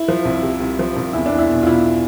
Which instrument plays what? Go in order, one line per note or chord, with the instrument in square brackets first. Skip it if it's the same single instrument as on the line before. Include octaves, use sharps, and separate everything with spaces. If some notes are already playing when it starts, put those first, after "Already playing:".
Already playing: [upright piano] E4
F3
C2
C3
C2
F3
C2
E2 E4
D4
E2
E4
B2
F4
B2 E4